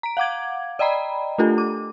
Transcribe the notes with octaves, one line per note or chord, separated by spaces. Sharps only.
A#5 D7
F5 F#5 D6 G#6
D5 D#5 G5 A#5 B5
A3 D4 F4 G4 A4
D6